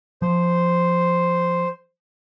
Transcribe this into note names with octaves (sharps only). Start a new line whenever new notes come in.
F3 C5